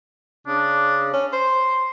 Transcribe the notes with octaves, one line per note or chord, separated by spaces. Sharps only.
C#3 D4
C#4
C5 C6